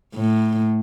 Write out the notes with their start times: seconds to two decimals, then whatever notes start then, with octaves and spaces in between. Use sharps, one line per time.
0.15 A2